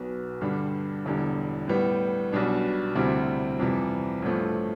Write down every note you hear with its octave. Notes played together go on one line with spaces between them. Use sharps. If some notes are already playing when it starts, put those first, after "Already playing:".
Already playing: B1 B2 B3
G2 D3 G3 D4
E1 E2 D3 G3
A2 G3 B3
B1 B2 G3 D4
D2 C3 G3 C4 E4
F2 C3 E3 G3
A1 G2 F3 A3